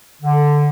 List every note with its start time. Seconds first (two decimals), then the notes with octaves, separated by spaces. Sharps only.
0.22 D3